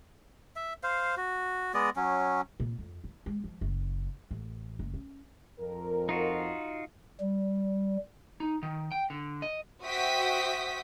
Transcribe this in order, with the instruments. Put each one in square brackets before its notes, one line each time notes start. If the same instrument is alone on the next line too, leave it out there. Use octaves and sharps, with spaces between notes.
[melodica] E5
C5 F5
F#4
G#3 B3 D5 D#5
F#3 C#4
[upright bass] A#2
F2
E4
G#3
F3
F#1
A1
F#1
C#4
[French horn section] F2 A#4
[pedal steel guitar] D#4 F4 F#4
[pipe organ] G3
[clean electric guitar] D#4
D#3
G5
D3
D#5
[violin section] F#4 C5 E5 G5 D#6 B6